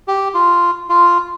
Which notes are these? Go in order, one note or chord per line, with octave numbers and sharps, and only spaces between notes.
G4
F4
F4